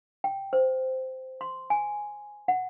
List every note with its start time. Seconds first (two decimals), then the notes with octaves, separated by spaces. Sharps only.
0.24 G5
0.53 C5
1.41 C6
1.70 G#5
2.48 F#5